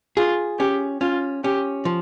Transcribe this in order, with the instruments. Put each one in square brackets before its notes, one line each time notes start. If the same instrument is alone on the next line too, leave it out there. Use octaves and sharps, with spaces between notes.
[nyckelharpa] F4 [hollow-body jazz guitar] G#4
[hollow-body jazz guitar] C#4 [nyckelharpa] G4
[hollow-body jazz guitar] C#4 [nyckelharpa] F4
[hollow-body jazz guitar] C#4 [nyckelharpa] G4
[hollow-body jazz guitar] F3